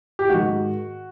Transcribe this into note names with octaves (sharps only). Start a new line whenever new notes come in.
G4
G#2 D#3 F#4